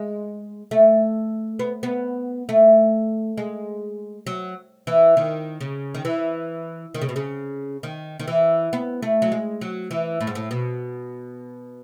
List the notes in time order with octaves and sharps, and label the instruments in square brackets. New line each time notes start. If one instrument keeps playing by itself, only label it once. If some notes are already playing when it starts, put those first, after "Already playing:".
Already playing: [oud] G#3
A3
B3
B3
A3
G#3
F#3
E3
D#3
C#3
D#3
E3
D#3
C#3
B2
C#3
D#3
D#3
E3
B3
A3
F#3
G#3
F#3
E3
A2
G#2
A2
B2